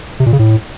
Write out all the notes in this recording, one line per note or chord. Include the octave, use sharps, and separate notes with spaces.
C3
A#2
C#3
A2